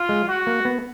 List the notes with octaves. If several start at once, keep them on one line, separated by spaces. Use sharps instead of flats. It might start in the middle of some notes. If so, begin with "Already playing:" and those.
Already playing: F4
G#3
F#4
A#3
B3